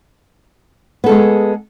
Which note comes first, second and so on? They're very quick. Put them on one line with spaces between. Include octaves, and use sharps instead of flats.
B3 A4 G#3 G#4